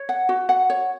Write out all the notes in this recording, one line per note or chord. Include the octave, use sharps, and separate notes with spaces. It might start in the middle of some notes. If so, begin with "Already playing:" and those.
Already playing: C#5
F#5
F#4
F#5
C#5